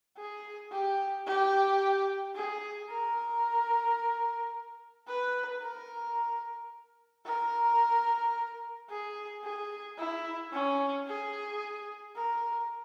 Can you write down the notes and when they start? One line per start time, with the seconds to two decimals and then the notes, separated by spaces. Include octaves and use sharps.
0.17 G#4
0.71 G4
1.26 G4
2.35 G#4
2.89 A#4
5.07 B4
5.62 A#4
7.26 A#4
8.89 G#4
9.43 G#4
9.98 E4
10.52 C#4
11.07 G#4
12.16 A#4